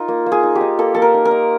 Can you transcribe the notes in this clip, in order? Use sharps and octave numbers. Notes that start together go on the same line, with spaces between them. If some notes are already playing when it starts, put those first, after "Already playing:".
Already playing: D#4 F4 A#4
A#3
A#3
G#4
D#4
G4
D#4
A#3 A4
A#3 A4
A#4
D#4
A#4
D#4